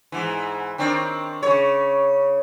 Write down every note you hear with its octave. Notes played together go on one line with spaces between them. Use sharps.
G#2 E3
D#3 C4 D4
C#3 C#5